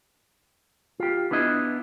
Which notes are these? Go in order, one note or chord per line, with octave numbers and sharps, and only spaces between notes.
F4 G4
B3 D4 E4 D#5